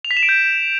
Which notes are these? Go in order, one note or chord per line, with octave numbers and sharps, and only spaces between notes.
F7
B6
E7
D7
G6